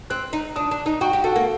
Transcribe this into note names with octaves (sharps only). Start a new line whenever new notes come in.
C4 F#6
D#4
D4 D#6
D4
D#4
F#4 G5
G4
F#4 A4
A#3